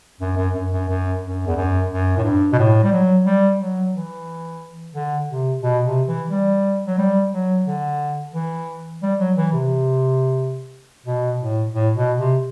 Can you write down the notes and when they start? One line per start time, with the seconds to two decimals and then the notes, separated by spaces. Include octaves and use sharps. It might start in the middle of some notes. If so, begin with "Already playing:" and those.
0.21 F#2
0.37 F#2
0.54 F#2
0.72 F#2
0.89 F#2
1.23 F#2
1.47 E2
1.57 F#2
1.90 F#2
2.18 A2
2.24 G2
2.53 B2
2.59 A2
2.84 G3
2.92 F#3
3.26 G3
3.59 F#3
3.93 E3
4.95 D3
5.30 C3
5.63 B2
5.86 C3
6.08 E3
6.30 G3
6.87 F#3
6.98 G3
7.32 F#3
7.66 D3
8.34 E3
9.02 G3
9.19 F#3
9.36 E3
9.53 C3
11.06 B2
11.40 A2
11.73 A2
11.96 B2
12.19 C3